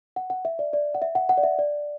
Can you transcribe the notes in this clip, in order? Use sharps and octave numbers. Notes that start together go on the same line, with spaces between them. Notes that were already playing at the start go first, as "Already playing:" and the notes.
F#5
F#5
E5
D5
D5
F#5
E5
F#5
F#5
D5
E5
D5